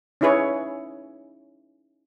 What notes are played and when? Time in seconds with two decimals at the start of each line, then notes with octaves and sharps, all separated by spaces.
0.21 C#4 D#4 E4 G#4 B4 C#5